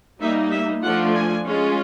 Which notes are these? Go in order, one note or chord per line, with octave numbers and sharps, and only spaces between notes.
G3 A#3 D#4 E5
E5
F3 A3 D4 F4 F#5
G#5
G#3 C#4 F4